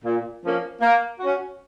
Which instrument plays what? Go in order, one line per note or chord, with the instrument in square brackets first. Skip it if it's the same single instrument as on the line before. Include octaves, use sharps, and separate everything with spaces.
[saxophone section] A#2
F3 A#3 C#4
A#3
F#4
C#4